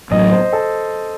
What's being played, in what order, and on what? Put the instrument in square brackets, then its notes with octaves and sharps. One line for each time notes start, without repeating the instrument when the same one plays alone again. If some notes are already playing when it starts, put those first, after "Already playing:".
[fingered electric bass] A1 A2 F#3 [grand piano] D#5
[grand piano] C5
A4